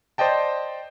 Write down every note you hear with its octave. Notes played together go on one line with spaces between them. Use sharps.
C5 D5 D#5 G5 A5